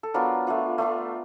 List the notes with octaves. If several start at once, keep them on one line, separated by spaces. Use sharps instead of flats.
A4
F#3 B3 D4 F4 A#4
A3 D4 F4
A3 D4 F4